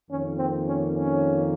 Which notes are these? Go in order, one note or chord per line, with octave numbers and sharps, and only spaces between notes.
F2 D#3 A#3 C#4
C4
C#4
C#4